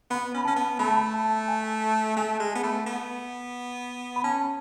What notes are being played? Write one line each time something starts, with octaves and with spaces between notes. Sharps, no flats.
B3 B5
C#4
B5
C#4 A5
B3
A3 B5
A5
B5
A5
G#5
A3 G#5
G#3 A5
B3
A3 B5
B3
B5
C#4 A5